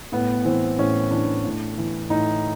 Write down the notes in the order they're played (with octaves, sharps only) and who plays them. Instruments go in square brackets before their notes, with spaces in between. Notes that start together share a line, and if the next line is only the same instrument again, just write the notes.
[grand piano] A2 B3
E3 C4
A2 C#4
E3 D4
A2
E3
A2 D#4